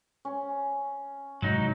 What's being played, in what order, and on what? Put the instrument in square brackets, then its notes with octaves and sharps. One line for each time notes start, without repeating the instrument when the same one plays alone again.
[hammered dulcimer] C#4
[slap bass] G#2 C3 E3 [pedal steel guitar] F#3 D#4